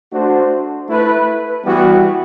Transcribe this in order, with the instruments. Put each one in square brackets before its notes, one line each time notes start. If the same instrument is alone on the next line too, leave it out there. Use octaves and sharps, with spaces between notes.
[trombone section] A3 D4 F#4 C5
A3 E4 B4
E3 G3 B3 F#4